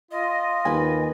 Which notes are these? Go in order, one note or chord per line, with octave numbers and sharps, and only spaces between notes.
F4 D#5
D#2 B4 G#5